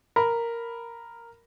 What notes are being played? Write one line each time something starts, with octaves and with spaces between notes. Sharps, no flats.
A#4 B5